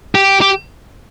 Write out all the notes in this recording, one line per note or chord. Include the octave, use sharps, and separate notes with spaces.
G4
G4